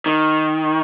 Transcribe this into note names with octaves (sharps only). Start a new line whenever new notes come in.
D#3